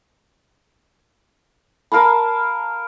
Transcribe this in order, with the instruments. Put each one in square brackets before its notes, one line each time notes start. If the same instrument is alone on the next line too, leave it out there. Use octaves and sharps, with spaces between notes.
[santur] A#4 F5 A5 B5